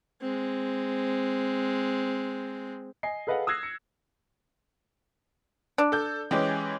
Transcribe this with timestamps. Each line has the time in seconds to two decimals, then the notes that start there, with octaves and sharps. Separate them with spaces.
0.21 G#3 C4
3.03 D#5 G#5 C7
3.27 G#4 A4 B4 D#5 F5 F#5
3.47 D#6 E6 F#6 G#6 A#6 C7
3.63 C#7
5.78 D4
5.92 A4 G6
6.31 E3 G#3 C#4 G4